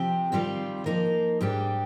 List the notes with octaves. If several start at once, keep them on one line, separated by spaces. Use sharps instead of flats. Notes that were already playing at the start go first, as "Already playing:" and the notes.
Already playing: C3 F3 C4 G4
D#3 G3 C4 F4
F3 A#3 D#4 A#4
G#2 G3 D4 G4